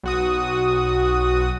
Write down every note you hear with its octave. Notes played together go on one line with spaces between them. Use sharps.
B1 F#4 D#6